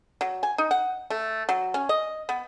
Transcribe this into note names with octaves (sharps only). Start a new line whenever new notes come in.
F#3
G#5
D#4
F#5
A3
F#3
C#4
D#5
B3